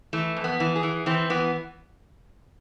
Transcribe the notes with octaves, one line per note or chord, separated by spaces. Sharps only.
E3 A3
F2
B3
E3
G#4
E3
E3 C4
E3 B3